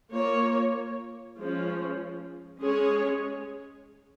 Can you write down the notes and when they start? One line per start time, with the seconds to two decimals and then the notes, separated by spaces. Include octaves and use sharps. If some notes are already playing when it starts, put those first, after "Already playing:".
0.12 A#3 F4 C#5
1.38 F3 G#3 C#4
2.62 G#3 C#4 G#4 C#5